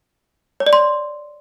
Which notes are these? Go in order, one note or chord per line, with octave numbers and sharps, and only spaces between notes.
C#5
D5
C6